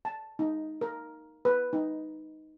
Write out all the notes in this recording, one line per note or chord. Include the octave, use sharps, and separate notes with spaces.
A5
D#4
A#4
B4
D#4